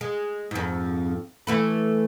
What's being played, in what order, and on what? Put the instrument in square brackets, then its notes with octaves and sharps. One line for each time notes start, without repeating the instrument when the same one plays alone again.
[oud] G#3
F2 G#2
E3 A3 B4